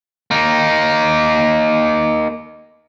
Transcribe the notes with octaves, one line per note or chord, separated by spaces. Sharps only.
A#3 D#4